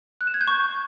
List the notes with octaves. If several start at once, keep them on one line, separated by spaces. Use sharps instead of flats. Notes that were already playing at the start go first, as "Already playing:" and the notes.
F#6
E7
G#6
G6
C#6